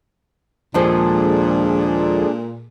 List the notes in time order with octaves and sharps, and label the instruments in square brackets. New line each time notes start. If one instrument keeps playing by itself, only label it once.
[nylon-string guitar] D#2 F3 C5 [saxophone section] A#2 [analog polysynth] G#3 G#4 A4 [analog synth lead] D4